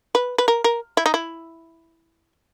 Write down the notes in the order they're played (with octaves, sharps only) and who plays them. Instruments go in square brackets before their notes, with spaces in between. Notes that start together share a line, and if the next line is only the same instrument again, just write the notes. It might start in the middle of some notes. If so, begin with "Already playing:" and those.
[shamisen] B4
B4
A#4
A#4
E4
D#4
E4